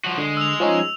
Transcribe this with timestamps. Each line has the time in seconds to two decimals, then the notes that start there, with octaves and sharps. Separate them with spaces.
0.05 F3 F#4
0.18 D3 G#3
0.37 E6 F7
0.60 F3 C#4 D#4